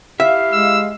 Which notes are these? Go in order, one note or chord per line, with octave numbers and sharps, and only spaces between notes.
E4 G4 E5 F5
G#3 E6